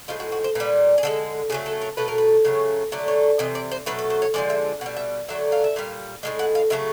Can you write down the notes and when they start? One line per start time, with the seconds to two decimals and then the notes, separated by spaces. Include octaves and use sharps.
0.08 A2 F3 G#3 F4
0.20 F#4
0.32 F#4
0.44 C5
0.55 A#2 G3 B4
0.98 G#4
1.03 D3 F3 G#3 A4
1.50 C#3 F#3 A3 G#4
1.66 A4
1.81 A#4
1.97 B2 F#3 A3 B4
2.08 A#4
2.18 B4
2.45 C#3 F#3 A3 C#5
2.92 D3 F#3 A3 D5
3.08 C#5
3.39 C3 E3 D#5
3.55 D5
3.71 C5
3.86 B2 F#3 A3 B4
3.99 B4
4.10 C5
4.22 C#5
4.34 D3 F3 G#3 D5
4.50 E5
4.81 B2 F#5
4.86 G3
4.97 E5
5.28 D3 F#3 A3 E5
5.52 F5
5.64 E5
5.76 A#2 G3 F5
6.23 A2 F3 G#3
6.39 F#5
6.55 F5
6.70 C#3 F#3 A3 E5